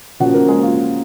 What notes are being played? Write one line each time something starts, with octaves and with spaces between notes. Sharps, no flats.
C#3 F3 A#3 C#4 F#4 F#5
A#3 A#4
G#3 G#4
F4